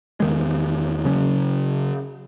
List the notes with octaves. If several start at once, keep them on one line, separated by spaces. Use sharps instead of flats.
E2 D#3 G#3
C#3 F#3 C#4